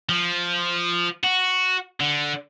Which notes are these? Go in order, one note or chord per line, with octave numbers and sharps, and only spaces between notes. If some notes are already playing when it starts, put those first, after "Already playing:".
F3
F#4
D3